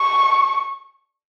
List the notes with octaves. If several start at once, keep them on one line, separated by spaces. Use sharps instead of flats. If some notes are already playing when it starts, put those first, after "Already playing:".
Already playing: C#6